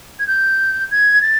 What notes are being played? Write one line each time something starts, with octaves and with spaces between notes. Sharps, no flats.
G#6
G6
G#6
A6